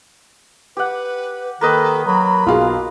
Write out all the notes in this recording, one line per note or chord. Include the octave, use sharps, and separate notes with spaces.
G4 B4 F#5
D#3 A#3 A4 B4 D#5
F#3 B5
B1 F4 G#4 F5